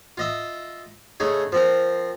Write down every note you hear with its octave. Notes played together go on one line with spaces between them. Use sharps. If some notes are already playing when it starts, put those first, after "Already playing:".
F4 D#5 E5
C#3 A3 D#4 G#4
F3 C4 A#4